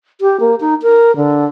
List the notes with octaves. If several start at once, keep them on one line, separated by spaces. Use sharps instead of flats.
G4
A#3
D#4
A#4
D3